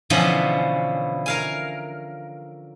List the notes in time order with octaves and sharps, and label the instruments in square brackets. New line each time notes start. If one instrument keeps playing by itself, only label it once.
[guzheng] B2 D3 E3 F3 B3 C#4
A#4 F5 G#5